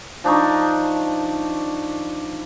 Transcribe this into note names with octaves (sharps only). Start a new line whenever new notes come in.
F3 D4 D#4 C#6